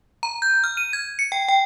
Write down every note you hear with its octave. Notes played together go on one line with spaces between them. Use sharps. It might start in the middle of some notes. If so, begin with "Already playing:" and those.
A#5
G6
F6
D#7
G#6
C#7
G5
G5